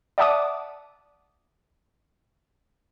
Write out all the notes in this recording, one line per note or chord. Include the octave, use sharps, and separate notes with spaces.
D5 E5 F#5 A5 D6 D#6